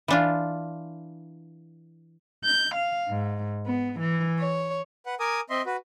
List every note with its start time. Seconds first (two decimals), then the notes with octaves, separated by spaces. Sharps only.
0.08 E3 D4 F4
2.44 G6
2.74 F5
3.08 G#2
3.66 B3
4.00 E3
4.39 C#5
5.06 B4 F#5
5.20 A#4 G#5 D6 D#6
5.50 C4 D#5 E5 C6
5.66 F#4 B4